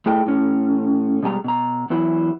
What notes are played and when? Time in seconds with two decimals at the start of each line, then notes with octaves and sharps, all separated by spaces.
0.06 A3 E4 G#4 A4 D#5 G5
0.26 A2 C#4
1.23 B2 G3 G#3 G#5 A#5
1.44 B2 A#5
1.90 E2 E3 F#3 E4